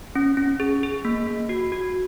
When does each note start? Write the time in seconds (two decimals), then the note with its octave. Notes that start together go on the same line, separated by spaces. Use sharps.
0.16 C#4
0.37 C#4
0.60 G#4
0.83 G#4
1.05 A#3
1.27 A#3
1.49 F#4
1.72 F#4